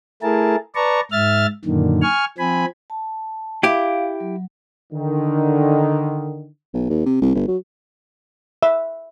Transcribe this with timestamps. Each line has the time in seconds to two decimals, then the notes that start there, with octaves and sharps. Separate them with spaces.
0.23 A3 E4 G#4 A#4 A5
0.75 B4 D5 A5 A#5 C#6
1.12 G#2 E5 F6 A6
1.65 F#2 A#2 D3 D#3
2.02 G#5 C#6 F6
2.38 F3 C4 G#5 B5
2.90 A5
3.63 E4 G4 F5
4.20 F#3
4.93 D3 D#3
6.74 B1
6.90 D#2
7.06 C3
7.21 C2
7.35 G1
7.48 F#3
8.63 E5